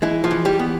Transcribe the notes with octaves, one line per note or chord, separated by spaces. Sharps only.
E3 G#3 E4
F3 F4
E3
G3 G4
B3